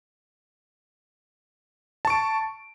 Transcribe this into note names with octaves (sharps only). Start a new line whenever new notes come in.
A5 C#6 D7